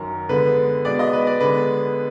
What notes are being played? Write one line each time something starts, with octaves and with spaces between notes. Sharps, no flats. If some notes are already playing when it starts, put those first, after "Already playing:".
Already playing: F#2 D#3 F#3 A#4
D3 G#3 B3 B4
B2 G#3 B3 D5
D#5
B4
D5
D3 G#3 B3 B4